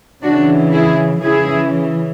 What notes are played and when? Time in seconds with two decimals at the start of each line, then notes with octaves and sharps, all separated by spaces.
0.23 C#3 E3 D4 F#4
0.73 E4 G#4
1.22 C#3 E3 E4 G#4